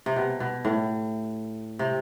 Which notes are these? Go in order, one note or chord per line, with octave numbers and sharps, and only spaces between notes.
C3
B2
B2
A2
C3